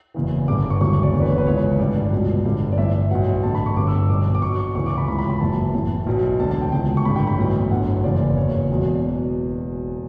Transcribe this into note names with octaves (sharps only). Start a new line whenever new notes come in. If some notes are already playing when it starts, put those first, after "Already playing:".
F#1 E2 C#3 E3
G1 G2 D3 D6
D6
C#6
E1 D2 C#3 E3 C#6
D5
F#1 E2 D3 C#5
B4
C#5
B4
C#2 C#3 E3 C#5
A1 G2 D3 D5
C#2 B2
G1 G2 D3
D5
A1 G2 E3 E5
B1 B2 F#5
A1 G2 D3 A5
B5
C#6
G1 G2 D3 D6
E6
E6
B1 B2 D6
D6
B1 B2 C#6
C#6
D2 C#3 E3 C#6
D6
B5
C#2 C#3 E3 B5
B5
B5
F#1 F#2 E3 A5
A1 A2 E3
B1 B2
E1 D2 D3 A5
A5
G5
C#2 C#3 E3 G5
C#6
A1 G2 D3 B5
G5
B5
B1 A2 E3
G1 F#2 D3 F#5
F#1 E2 C#3 E3 D5
F#1 E2 C#3 C#5
E1 E2 B2